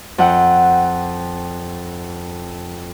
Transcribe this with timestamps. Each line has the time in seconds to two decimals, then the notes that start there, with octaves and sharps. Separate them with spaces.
0.18 F2 F#5 G5